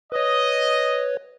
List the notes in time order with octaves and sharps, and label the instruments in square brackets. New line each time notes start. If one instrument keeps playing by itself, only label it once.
[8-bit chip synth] B4 C#5 [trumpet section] D#5